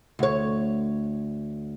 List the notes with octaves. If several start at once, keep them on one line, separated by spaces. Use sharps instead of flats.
D2 C#5